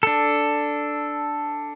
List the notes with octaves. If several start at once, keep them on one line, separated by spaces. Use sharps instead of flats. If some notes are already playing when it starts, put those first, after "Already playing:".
D4 A4